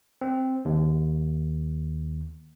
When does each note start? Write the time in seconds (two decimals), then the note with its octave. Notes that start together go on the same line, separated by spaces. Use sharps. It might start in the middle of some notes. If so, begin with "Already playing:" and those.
0.21 C4
0.65 D#2